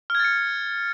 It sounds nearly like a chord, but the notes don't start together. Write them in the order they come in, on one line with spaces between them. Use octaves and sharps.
F6 G#6 A6 C#7